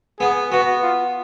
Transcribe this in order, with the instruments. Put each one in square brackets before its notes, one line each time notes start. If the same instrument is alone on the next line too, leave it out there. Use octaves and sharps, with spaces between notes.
[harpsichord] B3 [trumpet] G#4
[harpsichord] B3 [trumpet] F#4
[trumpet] F4